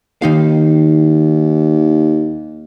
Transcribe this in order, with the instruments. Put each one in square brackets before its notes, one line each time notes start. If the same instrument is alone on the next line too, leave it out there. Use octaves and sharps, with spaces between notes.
[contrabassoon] D#2 [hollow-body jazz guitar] D#3 D#4 F5